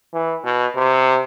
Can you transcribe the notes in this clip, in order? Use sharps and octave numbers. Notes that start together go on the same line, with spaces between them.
E3
B2
C3